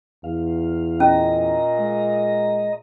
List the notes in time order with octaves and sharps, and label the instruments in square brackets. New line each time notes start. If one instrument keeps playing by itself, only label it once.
[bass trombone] E2 [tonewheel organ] F5
[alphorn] A#2 [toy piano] C#4 [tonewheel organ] D#5 A#5
[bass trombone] G#3